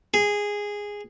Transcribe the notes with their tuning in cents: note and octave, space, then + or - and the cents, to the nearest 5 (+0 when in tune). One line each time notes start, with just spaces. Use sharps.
G#4 -10